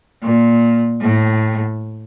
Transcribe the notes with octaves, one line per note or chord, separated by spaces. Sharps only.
A#2
A2